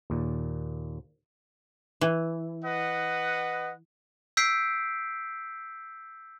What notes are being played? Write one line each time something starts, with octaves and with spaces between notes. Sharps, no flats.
D#2 A#2
E3
B4 D#5 F#5
E6 G6 B6 C7 D7